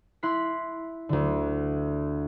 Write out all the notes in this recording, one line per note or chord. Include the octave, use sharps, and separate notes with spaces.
E4 C6 F#6 B6
D2 D3